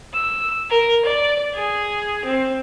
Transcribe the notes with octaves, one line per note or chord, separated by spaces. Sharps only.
E6
A#4
D5
G#4
C4